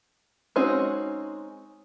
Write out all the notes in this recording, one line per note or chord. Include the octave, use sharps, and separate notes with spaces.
G#3 C4 C#4 D#4 F#4